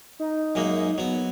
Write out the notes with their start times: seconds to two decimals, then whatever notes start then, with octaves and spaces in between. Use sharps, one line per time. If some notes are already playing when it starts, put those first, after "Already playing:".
0.20 D#4
0.55 F#2 G#3 A#3
0.98 F#3 B3